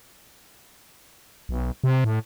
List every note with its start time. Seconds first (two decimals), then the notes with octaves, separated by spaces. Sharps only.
1.49 B1
1.84 C3
2.04 A2